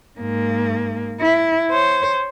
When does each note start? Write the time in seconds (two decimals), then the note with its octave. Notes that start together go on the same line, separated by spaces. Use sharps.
0.20 G#2 A#3
1.21 E4
1.71 C5 C#5